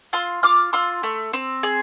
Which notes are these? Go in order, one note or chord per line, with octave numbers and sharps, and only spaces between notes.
F4 C6 E6
F4 D6 F6
F4 C6 E6
A3
C4
G#4